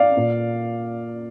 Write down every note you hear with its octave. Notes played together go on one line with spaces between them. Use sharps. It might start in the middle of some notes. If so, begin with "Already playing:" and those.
Already playing: D5 F5
A#2